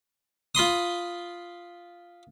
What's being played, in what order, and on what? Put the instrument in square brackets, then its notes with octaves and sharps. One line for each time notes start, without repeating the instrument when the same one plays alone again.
[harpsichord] F4 B5 C6 D#6